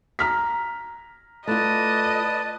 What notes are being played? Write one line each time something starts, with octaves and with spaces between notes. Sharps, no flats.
A#5 F6 B6
A3 F4 B4 D5 D#5 A5